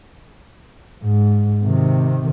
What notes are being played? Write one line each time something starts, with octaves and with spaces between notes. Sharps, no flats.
G#2
C3 D#3